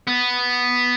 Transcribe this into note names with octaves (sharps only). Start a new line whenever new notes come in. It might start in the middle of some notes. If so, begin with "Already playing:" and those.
B3